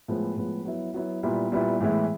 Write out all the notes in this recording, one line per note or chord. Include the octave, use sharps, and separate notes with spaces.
A2 F3 G#3 B3
A2 F3 G#3 B3
F#3 B3 E4
F#3 B3 E4
A#2 G3 B3 E4
A#2 G3 B3 E4
A2 E3 G#3 B3 E4